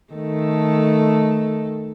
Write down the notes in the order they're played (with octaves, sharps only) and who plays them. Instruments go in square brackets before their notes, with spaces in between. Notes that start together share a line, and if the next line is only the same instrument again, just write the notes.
[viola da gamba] D#3 A3 A4